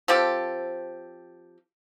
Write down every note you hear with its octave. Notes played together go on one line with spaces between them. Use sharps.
F3 C4 G4 A4